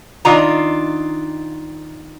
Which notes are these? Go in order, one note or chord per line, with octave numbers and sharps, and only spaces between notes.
D#3 D4 F4 A#5